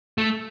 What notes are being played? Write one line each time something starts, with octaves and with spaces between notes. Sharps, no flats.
A3